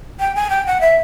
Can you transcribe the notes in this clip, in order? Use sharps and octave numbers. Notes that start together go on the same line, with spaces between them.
G5
G#5
G5
F#5
E5